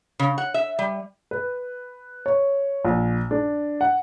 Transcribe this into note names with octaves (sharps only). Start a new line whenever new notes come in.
C#3
F#5
E5
G3
B4
C#5
A#1
D4
F#5